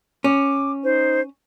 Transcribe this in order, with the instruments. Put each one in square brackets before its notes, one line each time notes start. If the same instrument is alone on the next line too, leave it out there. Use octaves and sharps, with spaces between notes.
[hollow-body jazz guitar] C#4 [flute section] D6
[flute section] D#4 C5